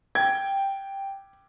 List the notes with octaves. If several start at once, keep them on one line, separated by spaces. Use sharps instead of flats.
G5 G#6